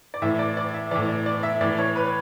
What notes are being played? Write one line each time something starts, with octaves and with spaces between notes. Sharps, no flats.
D5
A2 E3 E5
D5
D5
E5
A2 E3 D5
D5
D5
E5
A2 E3 D5
C#5
B4